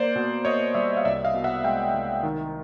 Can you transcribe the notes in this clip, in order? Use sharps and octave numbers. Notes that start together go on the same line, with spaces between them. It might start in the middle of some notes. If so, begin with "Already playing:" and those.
Already playing: A#3 C5 D5
B2
A#3 C#5 D#5
G3 D5 E5
F5
C2 D5 E5
D#5 F5
B2
E5 F#5
G#3 F5 G5
C2
D#3